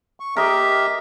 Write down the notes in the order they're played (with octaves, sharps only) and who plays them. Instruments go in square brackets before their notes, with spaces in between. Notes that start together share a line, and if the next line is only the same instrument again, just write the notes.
[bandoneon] C#6
[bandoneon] G4 E5 [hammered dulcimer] A#4 D#5